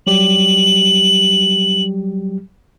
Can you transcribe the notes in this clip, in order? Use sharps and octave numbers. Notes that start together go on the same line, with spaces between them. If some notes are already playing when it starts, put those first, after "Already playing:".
F#3 G3 G4 F#7